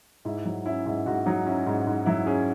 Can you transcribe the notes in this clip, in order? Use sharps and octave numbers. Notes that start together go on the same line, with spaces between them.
G#2 E4
F#3
C#4 E4
G#2 E4
G#2 F#4
F#3 D#4
C#4 E4
G#2
G#2
F#3 E4
C#4 G#4